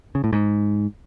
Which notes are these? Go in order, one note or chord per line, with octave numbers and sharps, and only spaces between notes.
C#3
A2
G#2